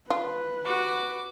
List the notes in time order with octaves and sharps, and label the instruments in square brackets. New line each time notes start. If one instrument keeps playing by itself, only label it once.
[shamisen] F4 [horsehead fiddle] B4
[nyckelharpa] F#4 [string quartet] D6